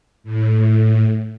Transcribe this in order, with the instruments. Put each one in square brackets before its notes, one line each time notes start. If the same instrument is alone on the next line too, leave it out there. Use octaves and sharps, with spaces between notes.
[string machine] A2